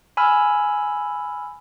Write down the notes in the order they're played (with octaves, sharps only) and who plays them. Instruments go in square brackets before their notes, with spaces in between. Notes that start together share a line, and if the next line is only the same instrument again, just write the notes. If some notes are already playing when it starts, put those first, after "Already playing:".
[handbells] G#5 B5 E6 F6